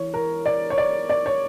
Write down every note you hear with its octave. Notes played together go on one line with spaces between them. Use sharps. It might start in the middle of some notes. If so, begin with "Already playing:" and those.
Already playing: E3 C#5
A#4
D5
C#5
D5
D5
C#5